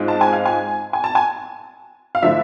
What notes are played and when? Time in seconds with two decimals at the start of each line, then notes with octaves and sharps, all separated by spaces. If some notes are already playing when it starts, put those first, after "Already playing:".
Already playing: G#2 G#3 C4 F4
0.08 A5
0.21 G#5
0.33 F5
0.46 G#5
0.93 G#5
1.04 A5
1.15 G#5
2.15 F5
2.22 D3 F3 A3 C4 E4 E5